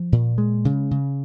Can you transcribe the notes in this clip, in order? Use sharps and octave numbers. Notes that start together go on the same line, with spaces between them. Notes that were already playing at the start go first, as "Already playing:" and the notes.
Already playing: F3
A#2
G#3
C#3
C#3